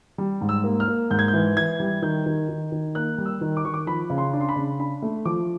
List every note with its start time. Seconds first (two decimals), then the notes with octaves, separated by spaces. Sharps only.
0.18 G3
0.41 G#2
0.49 E6
0.64 A#3
0.80 F6
0.88 A#3
1.10 G#2 G6
1.19 G#6
1.28 G6
1.33 E3
1.56 E3 G#6
1.80 G3
2.02 D#3 G6
2.26 D#3
2.49 D#3
2.72 D#3
2.95 A#3 F#6
3.18 G3
3.26 E6
3.41 D#3
3.57 D6
3.65 D#3 C#6
3.74 D6
3.87 F3 B5
4.10 C#3
4.18 C6
4.33 D4
4.40 C6
4.49 B5
4.56 C#3
4.79 D4 B5
5.02 A3
5.25 F3 D6